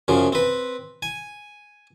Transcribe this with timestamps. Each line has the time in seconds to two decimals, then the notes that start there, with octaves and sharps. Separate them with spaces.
0.08 F#2 C#3 F3
0.33 C4 B4
1.02 G#5